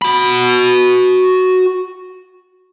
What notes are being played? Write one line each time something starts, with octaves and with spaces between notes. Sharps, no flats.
F#4 B5